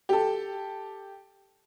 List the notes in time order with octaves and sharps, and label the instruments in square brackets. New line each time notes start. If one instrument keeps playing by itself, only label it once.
[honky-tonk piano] G4 A4